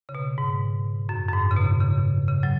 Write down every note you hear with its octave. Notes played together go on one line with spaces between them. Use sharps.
C#3
B2
G#2
F#2
F#2
G#2
C#3
B2
C#3
C#3
F#3